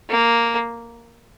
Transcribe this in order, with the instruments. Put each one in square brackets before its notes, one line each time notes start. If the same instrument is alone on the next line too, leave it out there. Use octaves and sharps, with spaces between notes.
[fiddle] A#3